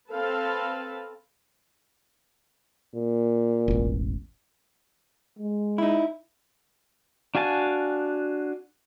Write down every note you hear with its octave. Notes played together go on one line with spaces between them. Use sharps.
C4 A4 B4 F5 A5
A#2
E1 A1
G#3
D#4 E4
D4 F#4 F5 G#5 A5